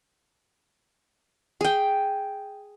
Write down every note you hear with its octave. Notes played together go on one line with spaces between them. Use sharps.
G#4 G5